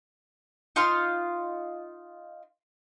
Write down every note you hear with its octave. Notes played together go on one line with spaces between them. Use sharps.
D#4 F4 C6 F6